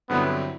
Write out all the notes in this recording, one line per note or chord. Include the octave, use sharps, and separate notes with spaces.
G2 D3 F#3 B3 C4 E4